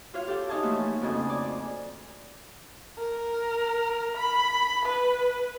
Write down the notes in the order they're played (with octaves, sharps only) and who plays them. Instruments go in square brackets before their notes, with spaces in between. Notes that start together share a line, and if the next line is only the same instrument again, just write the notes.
[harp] F4 F#4 C#5 F5
G4 A4 G5
D#4 C#5 D#5 F5 G#5 A5
E3 F3 A3 A#3 D#4 F#4
F2 C#3 F#4 A4 D#5 G#5
D5 G#5
[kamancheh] A#4
B5
B4